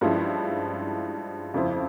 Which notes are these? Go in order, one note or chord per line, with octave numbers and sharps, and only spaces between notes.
G2 F3 G#3 C#4 E4
F2 C#3 F3 C4 E4